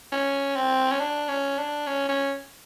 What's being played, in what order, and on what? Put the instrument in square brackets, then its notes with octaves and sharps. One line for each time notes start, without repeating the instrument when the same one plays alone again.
[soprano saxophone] C#4
C4
C#4
D4
C#4
D4
C#4
C#4